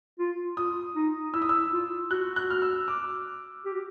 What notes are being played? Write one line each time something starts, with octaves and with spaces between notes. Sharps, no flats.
F4
F4 D#6
D#4
E4 E6
D#6
E6
F4
F#4 F#6
F#6
F6
E6
D6
G4
F#4